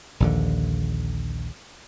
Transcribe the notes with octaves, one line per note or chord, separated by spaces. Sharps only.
A#1 D#2 D3